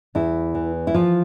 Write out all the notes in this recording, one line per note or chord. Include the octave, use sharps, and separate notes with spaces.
E2 E4
E3
E4
F3 F4